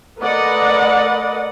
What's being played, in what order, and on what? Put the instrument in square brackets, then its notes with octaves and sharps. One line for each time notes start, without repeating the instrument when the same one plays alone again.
[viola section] A3 A#4 B4 D5 D#5 F#5